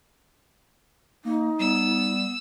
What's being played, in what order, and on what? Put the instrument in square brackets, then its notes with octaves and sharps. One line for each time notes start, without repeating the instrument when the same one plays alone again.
[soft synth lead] A#3 [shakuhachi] D#4
[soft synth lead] G3 [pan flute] B3 [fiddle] E6